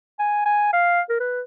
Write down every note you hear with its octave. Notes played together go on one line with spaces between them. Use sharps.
G#5
G#5
F5
A#4
B4